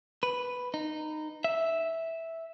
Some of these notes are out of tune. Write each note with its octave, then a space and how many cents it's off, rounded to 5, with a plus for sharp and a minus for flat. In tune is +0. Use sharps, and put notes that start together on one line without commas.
B4 +0
D#4 -15
E5 -5